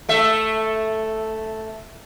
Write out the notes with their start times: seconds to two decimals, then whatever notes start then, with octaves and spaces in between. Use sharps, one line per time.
0.09 A3 E5